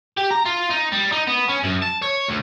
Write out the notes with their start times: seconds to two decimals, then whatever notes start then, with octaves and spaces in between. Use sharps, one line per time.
0.17 G4
0.31 A#5
0.46 F4
0.71 D#4
0.92 G3
1.12 D#4
1.27 B3
1.48 C#4
1.63 F#2
1.82 A5
2.02 C#5
2.28 D2